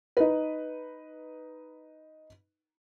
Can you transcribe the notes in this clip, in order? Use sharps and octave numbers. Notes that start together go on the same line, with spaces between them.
D#4 B4